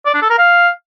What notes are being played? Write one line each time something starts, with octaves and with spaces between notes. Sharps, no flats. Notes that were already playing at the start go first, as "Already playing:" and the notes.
D5
D4
A4
A#4
F5